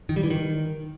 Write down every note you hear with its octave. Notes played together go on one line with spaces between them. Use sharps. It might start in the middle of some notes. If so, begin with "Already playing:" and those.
D#3
G3
E3
D#3